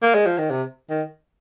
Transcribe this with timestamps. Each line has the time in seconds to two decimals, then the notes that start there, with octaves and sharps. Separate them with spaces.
0.02 A#3
0.15 G#3
0.26 F3
0.38 D#3
0.51 C3
0.90 D#3